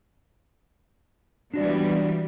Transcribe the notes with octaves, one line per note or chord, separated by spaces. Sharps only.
E3 G3 B3 D4 F#4 D5